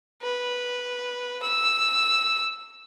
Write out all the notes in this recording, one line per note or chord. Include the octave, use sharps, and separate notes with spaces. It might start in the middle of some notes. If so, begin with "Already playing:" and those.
B4
E6